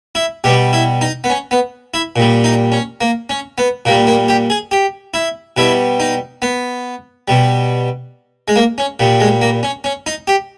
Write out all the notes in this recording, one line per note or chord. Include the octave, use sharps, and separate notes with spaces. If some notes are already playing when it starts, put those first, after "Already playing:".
E4
B2 G3 G4
E4
D#4
B3
C#4
B3
E4
A#2 G3
D#4
C#4
A#3
C#4
B3
A#2 G3 A#3
A#3
G4
G#4
G4
E4
B2 G3 E4
D#4
B3
B2 G3
G#3
A#3
C#4
A#2 G3
G#3
A#3
C#4
C#4
D#4
G4